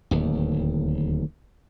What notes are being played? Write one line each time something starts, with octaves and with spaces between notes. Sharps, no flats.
D1 D#2